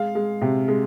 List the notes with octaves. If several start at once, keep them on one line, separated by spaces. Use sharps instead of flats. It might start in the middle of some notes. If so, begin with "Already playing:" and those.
Already playing: G#3 F5
G#3
C3
G#3